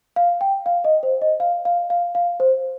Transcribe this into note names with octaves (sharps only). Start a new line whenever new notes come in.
F5
G5
F5
D#5
C5
D#5
F5
F5
F5
F5
C5